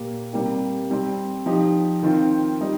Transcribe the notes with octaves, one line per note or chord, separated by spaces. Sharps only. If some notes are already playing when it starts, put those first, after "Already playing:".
Already playing: A#2 A#3 G4
C3 G3 A#3 G4
C3 G3 C4
F3 D#4 G4
D#3 C4 F4
G3 D#4